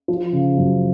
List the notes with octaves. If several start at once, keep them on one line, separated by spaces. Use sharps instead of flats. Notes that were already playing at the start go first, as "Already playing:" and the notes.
F3
C#3
F#2